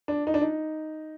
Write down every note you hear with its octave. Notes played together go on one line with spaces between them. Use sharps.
D4
D#4
D4
D#4